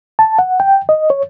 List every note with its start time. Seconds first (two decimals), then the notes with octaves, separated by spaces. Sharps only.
0.19 A5
0.39 F#5
0.60 G5
0.89 D#5
1.10 C#5